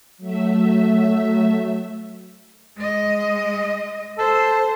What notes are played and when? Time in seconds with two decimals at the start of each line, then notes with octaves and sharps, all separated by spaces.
0.18 F#3 A3 E5
2.76 G#3 D#5
4.19 A4 C5